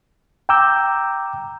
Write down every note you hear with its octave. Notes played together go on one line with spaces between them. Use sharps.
G5 A#5 D6 E6 G6